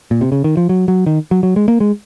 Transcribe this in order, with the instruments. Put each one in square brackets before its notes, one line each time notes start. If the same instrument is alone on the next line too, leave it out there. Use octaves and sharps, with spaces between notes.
[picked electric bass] A#2
C3
C#3
D#3
F3
F#3
F#3
D#3
F#3
F#3
G#3
A#3
G#3